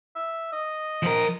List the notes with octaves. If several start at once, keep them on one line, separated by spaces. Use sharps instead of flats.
E5
D#5
F3 A#4